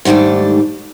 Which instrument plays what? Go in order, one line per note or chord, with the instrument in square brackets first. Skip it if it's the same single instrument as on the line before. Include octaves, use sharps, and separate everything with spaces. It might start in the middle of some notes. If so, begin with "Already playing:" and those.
[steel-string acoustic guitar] G#2 D#3 G3 A3 D4